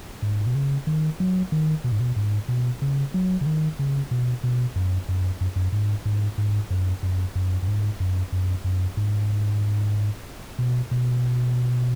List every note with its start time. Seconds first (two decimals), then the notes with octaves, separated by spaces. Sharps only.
0.22 G#2
0.46 B2
0.55 C#3
0.87 D#3
1.20 F#3
1.52 D#3
1.84 B2
1.92 G#2
2.00 B2
2.16 G#2
2.48 B2
2.82 C#3
3.14 F#3
3.41 C#3
3.46 D#3
3.79 C#3
4.11 B2
4.44 B2
4.76 F#2
5.09 F#2
5.41 F#2
5.56 F#2
5.72 G#2
6.06 G#2
6.38 G#2
6.71 F#2
7.03 F#2
7.35 F#2
7.62 F#2
7.68 G#2
8.00 F#2
8.33 F#2
8.64 F#2
8.97 G#2
10.59 B2
10.91 B2